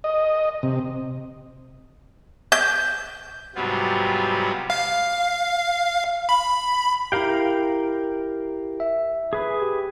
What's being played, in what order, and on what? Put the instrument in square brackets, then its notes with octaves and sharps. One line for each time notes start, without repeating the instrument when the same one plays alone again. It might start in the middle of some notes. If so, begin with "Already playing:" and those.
[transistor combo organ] D#5
C3
[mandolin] G6
[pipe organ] G#2 C3 F#3 G3 B3 F4
[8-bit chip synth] F5
B5
[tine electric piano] E4 G4 [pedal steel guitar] A#4 F5 G5
[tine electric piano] E5
[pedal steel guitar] G#4 B4
[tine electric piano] G4